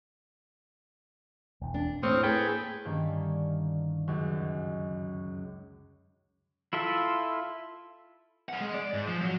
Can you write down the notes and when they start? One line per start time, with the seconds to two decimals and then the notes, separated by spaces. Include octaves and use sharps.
1.61 E1 E2
1.74 D4
2.03 A2 A#3 C4 C#6 D#6 F6
2.23 A3 G#4 A4 B4 G5
2.85 G2 D3 D#3 A#3 C#4
4.08 C#2 F#2
6.73 E4 F4 A4 E5
8.49 A#4 F#5
8.61 G#3
8.74 D5
8.94 G#2
9.08 F3
9.21 F#3 F#4